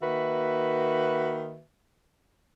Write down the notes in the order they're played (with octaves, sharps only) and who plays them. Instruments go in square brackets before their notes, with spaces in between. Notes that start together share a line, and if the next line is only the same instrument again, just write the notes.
[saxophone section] D#3 A#3 F#4 B4 E5